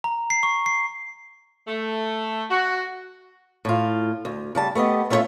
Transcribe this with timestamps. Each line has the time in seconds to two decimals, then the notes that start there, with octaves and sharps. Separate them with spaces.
0.04 A#5
0.30 C7
0.43 C#6
0.66 C7
1.67 A3
2.50 F#4
3.65 A2 F4
4.25 D2
4.55 C#3 G3 A5
4.75 A3 B3 G4 D#5
5.10 A3 C#4 E4 F4 C#5 E5